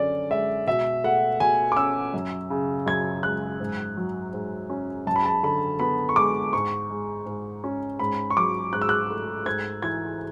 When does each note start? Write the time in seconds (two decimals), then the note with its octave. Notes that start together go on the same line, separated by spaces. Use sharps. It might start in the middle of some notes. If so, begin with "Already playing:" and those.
Already playing: F#2 D3 C#4 D5
0.30 G#3 E5
0.67 B2 E5
1.04 A3 F#5
1.40 B2 G#5
1.72 D6
1.77 C#4 E6
2.14 F#2
2.50 C#3
2.86 F#2 G#6
3.23 G#3 F#6
3.60 G#2
3.97 F#3
4.33 G#2
4.70 C#4
5.07 F#2 A5
5.16 B5
5.25 A5
5.43 D3 B5
5.80 B3 B5
6.09 C#6
6.16 G#3 D6
6.53 G#2 C#6
6.90 G#3
7.26 G#2
7.64 C#4
8.00 G#2 B5
8.30 C#6
8.37 F#3 D6
8.73 G#2 F#6
8.81 E6
8.89 F#6
9.10 A3
9.46 G#2 G#6
9.82 E3 G#6